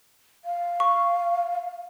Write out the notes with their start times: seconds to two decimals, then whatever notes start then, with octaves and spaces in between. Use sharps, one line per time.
0.45 F5
0.80 C#6